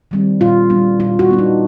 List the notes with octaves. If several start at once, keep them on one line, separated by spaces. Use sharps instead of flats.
D#3 G3 C4
A#2 F4
G3 B3 D4
A#2 F4
F#4
G3 B3 D4
D#4